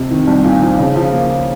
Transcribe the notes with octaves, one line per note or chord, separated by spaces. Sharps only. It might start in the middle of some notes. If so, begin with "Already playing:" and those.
Already playing: F2 C3
D#3
C2
A#2
F3
C#3
F3
A#3